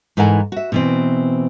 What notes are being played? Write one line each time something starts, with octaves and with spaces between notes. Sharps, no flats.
G#2 E3 A4 A#4 F#5 G#5
F#4 E5
B2 E3 C4